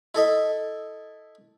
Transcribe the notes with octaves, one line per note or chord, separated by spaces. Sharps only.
E4 A4 D#5 E5